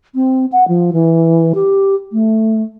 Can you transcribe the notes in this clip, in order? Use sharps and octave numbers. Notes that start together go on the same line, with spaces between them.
C4
F#5
F3
E3
G4
A3